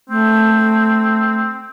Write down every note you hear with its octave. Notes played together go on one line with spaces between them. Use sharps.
A3 C4